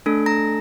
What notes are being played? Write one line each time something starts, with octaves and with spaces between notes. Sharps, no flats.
A3 D4 A4
A#5 A#6